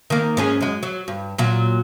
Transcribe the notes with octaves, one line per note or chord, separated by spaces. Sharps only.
D#3 A#3
G#2 C#4 G#4
F#2 G#3
F#3
G2
A#2 F#3